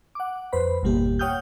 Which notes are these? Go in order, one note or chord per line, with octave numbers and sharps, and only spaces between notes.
F#5 D6
F2 B4 C5 B5
G1 E2 B2 G3 A#3 G4
C#5 F#5 G5 D#6 F6 G6